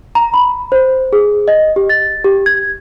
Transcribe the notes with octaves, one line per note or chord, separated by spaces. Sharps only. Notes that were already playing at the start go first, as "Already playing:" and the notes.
A#5
B5
C5
G#4
D#5
G4
A6
G4
G#6